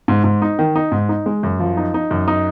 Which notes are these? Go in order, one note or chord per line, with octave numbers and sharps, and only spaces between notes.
G#2
G#2
D#4
D#3
D#4
G#2
D#4
G#3
F#2
F3
D#4
D#4
F#2
D#4